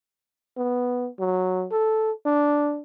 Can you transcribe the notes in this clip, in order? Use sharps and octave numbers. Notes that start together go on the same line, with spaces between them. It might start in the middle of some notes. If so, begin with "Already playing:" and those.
B3
F#3
A4
D4